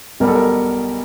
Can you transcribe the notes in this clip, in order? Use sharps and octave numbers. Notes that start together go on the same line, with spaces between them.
B1 B2 G3 A#4
A4
A#4